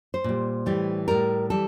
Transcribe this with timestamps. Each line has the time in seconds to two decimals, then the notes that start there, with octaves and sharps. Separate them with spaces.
0.14 C5
0.24 A#2 G3
0.66 A2 E3 G3
1.08 A2 G3 A#4
1.50 E3 G3 A4